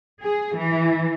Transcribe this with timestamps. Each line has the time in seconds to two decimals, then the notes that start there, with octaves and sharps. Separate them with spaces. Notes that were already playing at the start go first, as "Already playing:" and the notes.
0.23 G#4
0.56 E3